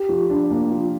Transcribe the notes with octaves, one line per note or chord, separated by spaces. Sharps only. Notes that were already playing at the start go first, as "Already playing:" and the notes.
Already playing: G4
F3
D4
A#3
F3